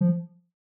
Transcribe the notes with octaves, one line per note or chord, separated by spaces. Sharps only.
F3